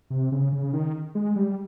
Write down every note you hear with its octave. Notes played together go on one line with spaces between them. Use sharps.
C3
C#3
C#3
D#3
G#3
G3